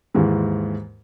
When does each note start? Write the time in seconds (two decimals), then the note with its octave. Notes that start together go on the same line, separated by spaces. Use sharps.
0.14 D#2 G#2 E3 G#3